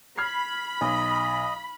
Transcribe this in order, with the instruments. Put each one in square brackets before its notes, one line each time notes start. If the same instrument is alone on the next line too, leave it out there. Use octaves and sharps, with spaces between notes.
[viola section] B5 [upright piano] F6 G#6 C7
[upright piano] B1 [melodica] D#5